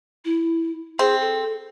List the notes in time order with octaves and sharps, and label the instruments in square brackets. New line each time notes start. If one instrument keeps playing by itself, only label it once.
[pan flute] E4
[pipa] C4 [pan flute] G#4
[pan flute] A4